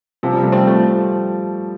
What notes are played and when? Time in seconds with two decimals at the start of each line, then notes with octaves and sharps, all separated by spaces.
0.23 C3 F3
0.33 G3
0.38 C3 A3
0.52 G3 C4
0.67 F3 A3